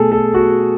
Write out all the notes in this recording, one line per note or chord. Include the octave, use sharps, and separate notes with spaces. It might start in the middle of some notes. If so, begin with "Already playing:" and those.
Already playing: B2 A3 G#4 A4
A4
F#4